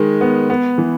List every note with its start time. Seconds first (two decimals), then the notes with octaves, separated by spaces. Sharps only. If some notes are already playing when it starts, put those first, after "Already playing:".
Already playing: D#3 G#3
0.21 B3
0.50 B3
0.78 E3